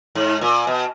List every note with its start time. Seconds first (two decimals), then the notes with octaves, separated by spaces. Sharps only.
0.15 G#2
0.41 A#2
0.67 B2